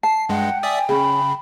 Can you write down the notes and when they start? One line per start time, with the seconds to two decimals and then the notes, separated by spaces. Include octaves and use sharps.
0.03 A5 C7
0.29 G2 G#3 F#5 G5
0.63 D5 E5 G#5 D#6
0.89 C#3 C#4 G#4 B5